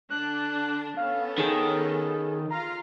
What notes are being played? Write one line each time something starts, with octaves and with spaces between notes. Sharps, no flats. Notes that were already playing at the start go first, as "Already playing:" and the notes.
D3 D4 F#6
B3 C#4 A4 F5
D#3 G#4
F4 F5 A#5